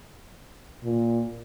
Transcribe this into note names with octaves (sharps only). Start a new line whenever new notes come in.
A#2